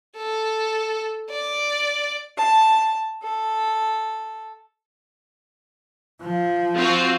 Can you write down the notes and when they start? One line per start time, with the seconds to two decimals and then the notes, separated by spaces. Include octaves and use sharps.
0.16 A4
1.31 D5
2.36 A5
3.23 A4
6.22 F3
6.75 C4 F4 F#4